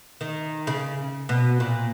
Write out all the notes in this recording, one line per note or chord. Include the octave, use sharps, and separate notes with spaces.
D#3
C#3
B2
A#2